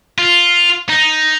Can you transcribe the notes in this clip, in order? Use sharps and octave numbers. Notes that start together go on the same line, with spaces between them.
F4
D#4